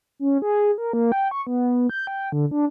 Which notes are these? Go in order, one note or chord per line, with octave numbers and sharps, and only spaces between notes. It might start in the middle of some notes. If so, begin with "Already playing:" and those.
C#4
G#4
A#4
A#3
G5
C#6
B3
G6
G5
D3
D4